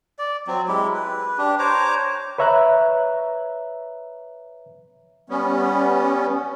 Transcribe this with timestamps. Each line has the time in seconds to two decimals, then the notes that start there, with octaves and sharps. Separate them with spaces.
0.19 D5
0.47 F#3 C4
0.68 G#3 E4 G4
0.94 B4
1.38 D4 G4
1.59 C5 C#5 A#5 D6
2.38 B4 C#5 E5 A#5 F#6
5.29 G3 B3 C#4